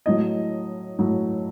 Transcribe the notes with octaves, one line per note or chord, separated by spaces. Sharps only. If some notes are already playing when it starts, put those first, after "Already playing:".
A2 F#3 D#5
A2 F#3